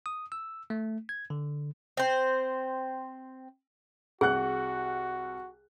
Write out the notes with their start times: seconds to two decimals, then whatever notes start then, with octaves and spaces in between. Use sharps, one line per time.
0.06 D#6
0.32 E6
0.70 A3
1.09 G#6
1.30 D3
1.97 C4 C5
4.21 C2 F#4 G#4 F#5 F#6